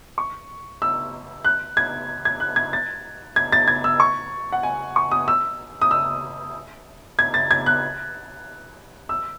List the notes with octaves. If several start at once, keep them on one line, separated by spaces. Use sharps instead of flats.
C#6
E6
F#6
G#6
G#6
F#6
G#6
A6
G#6
A6
G#6
E6
C#6
F#5
G#5
C#6
D#6
E6
D#6
E6
G#6
A6
G#6
F#6
E6